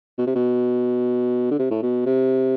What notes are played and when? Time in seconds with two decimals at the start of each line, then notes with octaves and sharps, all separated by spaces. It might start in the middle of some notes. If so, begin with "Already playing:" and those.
0.18 B2
0.27 C3
0.35 B2
1.51 D3
1.59 C3
1.71 A2
1.82 B2
2.06 C3